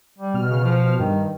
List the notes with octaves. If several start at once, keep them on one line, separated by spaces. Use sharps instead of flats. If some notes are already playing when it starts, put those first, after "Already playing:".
G3
B2 F6
C#3
F3
G2 D#3